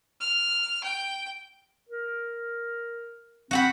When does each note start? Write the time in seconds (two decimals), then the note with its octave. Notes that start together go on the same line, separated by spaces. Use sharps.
0.20 F6
0.84 G5
1.89 A#4
3.51 C4 F#4 F#5 B5